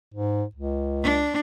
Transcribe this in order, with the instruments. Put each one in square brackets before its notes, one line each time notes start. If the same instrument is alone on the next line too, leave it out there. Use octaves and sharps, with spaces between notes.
[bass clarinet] G#2
C#2
[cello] D4